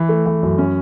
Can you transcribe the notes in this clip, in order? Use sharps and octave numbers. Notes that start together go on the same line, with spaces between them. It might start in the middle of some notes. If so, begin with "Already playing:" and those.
Already playing: E3
A3
E3
F#2
C#4